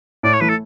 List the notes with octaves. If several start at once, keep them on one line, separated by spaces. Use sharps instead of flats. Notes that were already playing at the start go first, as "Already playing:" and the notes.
A2 D5
C#5
E3 A3 B4
A4